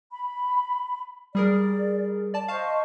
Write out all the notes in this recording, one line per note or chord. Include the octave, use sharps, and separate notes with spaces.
B5
G3 G#4 A#4 D5
D5 A5
C5 D#5 F5 A5 C#6